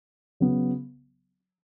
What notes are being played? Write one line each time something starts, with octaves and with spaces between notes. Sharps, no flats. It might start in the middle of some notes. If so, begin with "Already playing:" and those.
C#3 F#3 B3